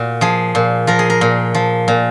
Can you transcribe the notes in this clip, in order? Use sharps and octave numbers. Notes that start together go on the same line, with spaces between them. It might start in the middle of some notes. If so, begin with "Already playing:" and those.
Already playing: A#2 F#4
F3 G#4
A#2
F3 A#4
G#4
A#4
A#2
F3
A#2